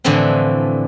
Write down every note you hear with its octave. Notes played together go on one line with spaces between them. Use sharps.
A2 D3 E3 F3 C4